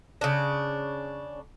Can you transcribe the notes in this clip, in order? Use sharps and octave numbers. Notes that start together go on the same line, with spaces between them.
C#3 D4